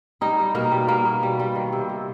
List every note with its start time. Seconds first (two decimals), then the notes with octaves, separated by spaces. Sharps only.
0.21 G3 D#4
0.39 G3
0.55 B2 A#3
0.72 G3
0.88 G3 A#3
1.05 B2
1.23 G3
1.40 G3
1.55 D#3
1.73 C3
1.89 C3